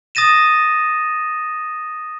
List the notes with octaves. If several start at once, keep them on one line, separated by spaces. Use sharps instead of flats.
D#6 A6 A#6 D#7 E7